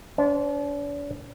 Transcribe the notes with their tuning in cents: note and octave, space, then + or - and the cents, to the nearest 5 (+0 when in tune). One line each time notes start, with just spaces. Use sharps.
D4 -40 C5 +0